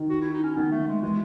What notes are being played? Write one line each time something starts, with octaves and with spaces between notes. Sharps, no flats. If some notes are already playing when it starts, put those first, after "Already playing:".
Already playing: D#3
F#4
E4
D#4
C#4
D#3 B3
A3
D#3
G#3
E3 G#3